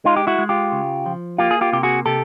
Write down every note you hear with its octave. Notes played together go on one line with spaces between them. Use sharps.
G#3 D#4 F4
G4
E4 F#4
G#3
F4 G4
C#3
F3
A#3 F4 G4
G#4
F4 G4
C3 G4
F#4 G#4
C3 G4 A4